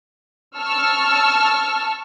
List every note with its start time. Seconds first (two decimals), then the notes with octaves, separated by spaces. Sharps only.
0.58 A5 C#6 E6 F6